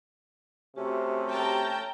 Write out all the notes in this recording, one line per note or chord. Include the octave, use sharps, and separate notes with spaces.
C3 A3 C#4 F#4 G4
G5 A5 A#5